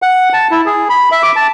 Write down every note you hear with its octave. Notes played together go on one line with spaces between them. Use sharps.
F#5
A5
E4
G#4
B5
E5
D6
A5